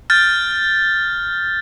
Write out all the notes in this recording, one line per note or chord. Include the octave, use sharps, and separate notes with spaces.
F6 G6 A6